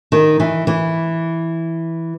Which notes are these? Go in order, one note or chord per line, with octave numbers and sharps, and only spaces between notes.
D#3
E3
E3